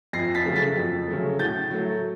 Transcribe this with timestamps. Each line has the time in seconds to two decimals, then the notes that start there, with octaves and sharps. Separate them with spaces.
0.13 F2 A#6 C7
0.35 A6 B6
0.45 C#3 F#3 A3
0.56 A6 B6
0.77 F2
1.08 C#3 F#3 A3
1.39 A2 G6 A6
1.71 F#3 A3